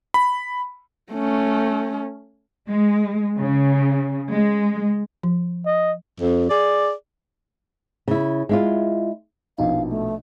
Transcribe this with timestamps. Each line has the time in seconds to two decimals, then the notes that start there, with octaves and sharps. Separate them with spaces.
0.14 B5
1.12 A3 C#4
2.69 G#3
3.40 C#3
4.30 G#3
5.23 F3
5.66 D#5
6.21 F2
6.50 G#4 D5
8.08 C#3 E4
8.49 G#3 E4 F4
9.58 A#1 B2 D#4 F5
9.90 A3